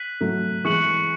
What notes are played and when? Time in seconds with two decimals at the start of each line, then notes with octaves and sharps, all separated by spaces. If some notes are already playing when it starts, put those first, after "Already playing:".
Already playing: F#6 B6 D#7 F#7
0.21 F#3 A3
0.65 E3 G#3 C#6 F#6 C#7 F#7